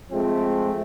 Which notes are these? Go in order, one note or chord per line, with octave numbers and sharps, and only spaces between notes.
F3 G#3 A3 C4